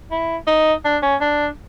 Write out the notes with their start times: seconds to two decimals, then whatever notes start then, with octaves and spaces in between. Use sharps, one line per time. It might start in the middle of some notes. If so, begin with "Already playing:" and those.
0.11 E4
0.47 D#4
0.85 D4
1.02 C#4
1.21 D4